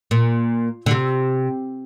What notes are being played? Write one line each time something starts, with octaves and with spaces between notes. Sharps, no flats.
A#2
D3
C3